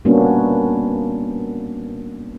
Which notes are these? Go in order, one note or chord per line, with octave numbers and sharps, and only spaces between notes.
G3 A#3 B3 C#4 D4 F#4